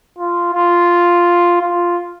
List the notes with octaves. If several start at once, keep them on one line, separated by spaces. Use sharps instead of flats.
F4
F4
F4